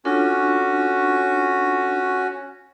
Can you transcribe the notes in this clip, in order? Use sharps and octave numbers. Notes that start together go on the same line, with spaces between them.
C#4 D4 F4 F#4 A4